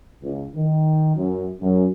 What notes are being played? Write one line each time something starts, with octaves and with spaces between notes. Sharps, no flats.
C#2
D#3
F#2
F#2